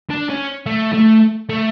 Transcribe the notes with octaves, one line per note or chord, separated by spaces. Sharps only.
D4
C#4
A3
A3
A3